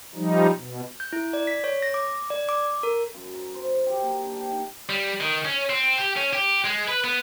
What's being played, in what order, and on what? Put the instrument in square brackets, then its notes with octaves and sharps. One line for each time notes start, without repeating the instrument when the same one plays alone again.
[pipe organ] F3 G3 D#4
B2
[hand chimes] G6
E4
D5
B6
C#5
A#6
D6
D5
D6
A#4
[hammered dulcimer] F#2
A#5
C5
G4
A#3
D4
G5
D#4
[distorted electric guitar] G3
D#3
C#4
C4
G4
C#4
G4
G#3
B4
B3